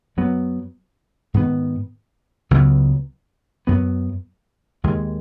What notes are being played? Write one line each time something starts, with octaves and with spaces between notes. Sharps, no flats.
F#2 F#3 B3
G#2 D#3 B3
C#2 C#3 F#3 B3
F#2 F#3 B3
D#2 D#3 G#3